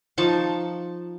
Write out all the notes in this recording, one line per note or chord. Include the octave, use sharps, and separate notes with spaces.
F3 D#4 A5 C#6